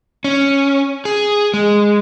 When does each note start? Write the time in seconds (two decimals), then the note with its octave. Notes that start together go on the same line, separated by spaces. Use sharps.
0.24 C#4
1.05 G#4
1.54 G#3